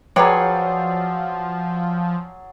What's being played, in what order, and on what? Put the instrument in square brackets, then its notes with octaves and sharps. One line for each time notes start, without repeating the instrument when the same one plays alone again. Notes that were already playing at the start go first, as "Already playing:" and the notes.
[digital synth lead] F3 [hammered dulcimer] F#3 G#4 D5 [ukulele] B4 C#5 [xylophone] G5 A#5